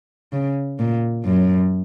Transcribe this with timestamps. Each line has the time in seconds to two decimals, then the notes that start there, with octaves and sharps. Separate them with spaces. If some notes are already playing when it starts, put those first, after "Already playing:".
0.33 C#3
0.79 A#2
1.25 F#2